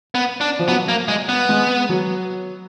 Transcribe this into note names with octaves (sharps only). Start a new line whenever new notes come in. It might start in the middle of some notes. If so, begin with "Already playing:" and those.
B3
D4
F3
F#3 B3
A#3
G#3
B3
G#3
F#3